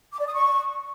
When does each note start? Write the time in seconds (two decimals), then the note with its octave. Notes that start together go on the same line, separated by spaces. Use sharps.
0.13 D6
0.20 D5
0.26 D#6
0.33 C#6